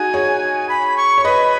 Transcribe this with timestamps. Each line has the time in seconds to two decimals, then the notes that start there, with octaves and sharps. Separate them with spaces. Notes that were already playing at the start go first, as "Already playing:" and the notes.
Already playing: D#4 F#4 G#4 G#5
0.14 G#4 C#5
0.69 B5
0.97 C#6
1.18 C#5
1.24 B4 D#5 B5